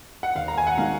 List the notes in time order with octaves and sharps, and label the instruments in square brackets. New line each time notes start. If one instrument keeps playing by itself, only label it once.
[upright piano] F#5
[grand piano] D#2 [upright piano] F5
[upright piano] A#5
G#5
F#5
[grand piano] D#3 G#3 D#4 F#4 [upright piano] F5